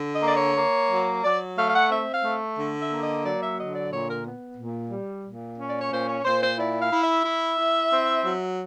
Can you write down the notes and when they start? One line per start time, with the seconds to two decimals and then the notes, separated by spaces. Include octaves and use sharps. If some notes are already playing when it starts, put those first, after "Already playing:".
Already playing: D3
0.13 D#5
0.23 A#3 D5
0.35 C#5
0.56 A#3
0.91 F#3
1.24 F#3 D5
1.57 A3 F5
1.68 F5
1.74 F#5
1.90 C4 E5
2.13 F5
2.24 A3
2.57 D3
2.79 E5
2.91 A#3
3.02 D#5
3.24 F#3 D5
3.40 E5
3.57 D3 D#5
3.74 D5
3.91 A#2 C#5
4.08 A#4
4.25 B3
4.57 A#2
4.90 G3
5.25 A#2
5.57 C#4
5.67 D5
5.79 C#5
5.91 A#2 C5
6.08 C#5
6.24 A#2 C5
6.41 C5
6.57 E4 D5
6.80 F5
6.92 E4
7.02 E5
7.25 E4
7.58 E4
7.92 C4
8.24 F#3